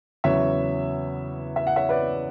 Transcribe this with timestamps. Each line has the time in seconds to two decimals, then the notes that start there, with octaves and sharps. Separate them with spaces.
0.24 E2 C#3 F#3 B3 C#5 E5
1.56 E5
1.67 F#5
1.76 C#5 E5
1.89 B4 D5